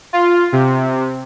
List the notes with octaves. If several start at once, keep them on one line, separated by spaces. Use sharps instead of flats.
F4
C3